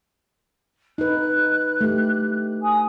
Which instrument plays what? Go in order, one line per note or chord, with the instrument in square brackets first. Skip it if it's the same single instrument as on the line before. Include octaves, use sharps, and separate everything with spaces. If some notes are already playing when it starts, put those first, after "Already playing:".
[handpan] D#4 B4 [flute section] F#6
[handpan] A3 G4
[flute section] G#5 D#6